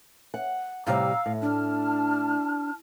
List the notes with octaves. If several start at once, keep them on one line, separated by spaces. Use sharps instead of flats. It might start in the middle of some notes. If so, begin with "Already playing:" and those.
F#5
A2 C3 G3 F5 A#5 E6
A2
D4 A5 F6